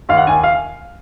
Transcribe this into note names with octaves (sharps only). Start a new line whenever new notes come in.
D#2 F5
F#5
D#2 G#5
F5